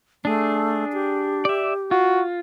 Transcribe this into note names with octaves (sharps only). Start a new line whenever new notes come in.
A3 D4 G#4
G4
D5 E5
F4 F#4